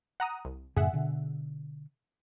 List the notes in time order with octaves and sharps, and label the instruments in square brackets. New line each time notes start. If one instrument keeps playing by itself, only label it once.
[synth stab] F#5 A#5 D#6
C2
[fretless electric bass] F#2 A2 C#3 [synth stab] G#4 E5 F#5
[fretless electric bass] B2 D3